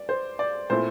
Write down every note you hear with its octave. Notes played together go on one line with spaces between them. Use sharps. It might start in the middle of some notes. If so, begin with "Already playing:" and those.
Already playing: D5
C5
D5
A#2 A3 C4 E4 C5